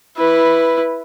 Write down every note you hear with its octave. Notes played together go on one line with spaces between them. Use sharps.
E4 B4